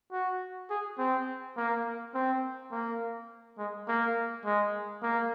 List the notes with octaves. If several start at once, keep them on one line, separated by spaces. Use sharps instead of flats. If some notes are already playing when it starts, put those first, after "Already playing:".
F#4
G#4
C4
A#3
C4
A#3
G#3
A#3
G#3
A#3